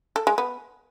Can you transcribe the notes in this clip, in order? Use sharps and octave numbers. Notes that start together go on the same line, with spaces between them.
A4
G#3
B3